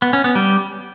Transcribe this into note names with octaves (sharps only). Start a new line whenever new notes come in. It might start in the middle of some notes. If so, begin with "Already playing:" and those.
B3
C#4
B3
G3